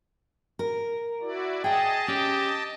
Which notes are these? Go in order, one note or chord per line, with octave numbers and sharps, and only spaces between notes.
A#4
E4 F#4 D5
G#4 D#5 F#5 G5 A5
C#4 G4